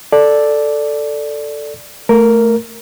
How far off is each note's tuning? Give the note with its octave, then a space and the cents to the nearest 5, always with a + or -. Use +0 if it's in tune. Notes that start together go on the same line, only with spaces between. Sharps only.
A4 +0 D5 +0
A3 +0 A#4 +0